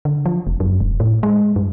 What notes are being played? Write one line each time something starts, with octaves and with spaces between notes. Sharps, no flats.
D3
F3
F1
F#2
E1
A2
G#3
G2